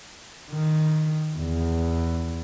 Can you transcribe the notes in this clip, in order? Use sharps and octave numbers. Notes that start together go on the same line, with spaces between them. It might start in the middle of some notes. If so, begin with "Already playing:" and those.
D#3
E2